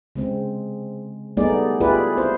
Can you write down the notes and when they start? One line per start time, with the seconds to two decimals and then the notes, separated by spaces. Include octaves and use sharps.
0.16 C#3 G#3 C4
1.37 G3 A3 B3 D#4 G#4 D5
1.80 E4 F4 G4 G#4 B4 D5
2.17 C4 E4 C5